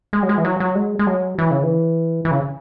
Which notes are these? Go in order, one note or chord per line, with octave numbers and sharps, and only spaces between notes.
G#3
F#3
G#3
E3
F#3
F#3
G#3
G#3
F#3
E3
C#3
E3
E3
C#3